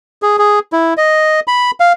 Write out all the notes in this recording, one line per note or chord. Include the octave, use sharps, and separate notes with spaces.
G#4
G#4
E4
D#5
B5
F5